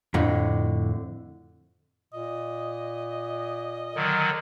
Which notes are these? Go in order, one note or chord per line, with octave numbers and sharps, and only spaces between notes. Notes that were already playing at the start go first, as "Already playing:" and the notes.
F2 A2 D3
A#2 D#5
D3 D#3 F#3